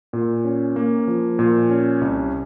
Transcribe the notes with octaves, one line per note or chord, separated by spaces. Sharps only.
A#2
C#4
A#3
F3
A#2
C#4
C2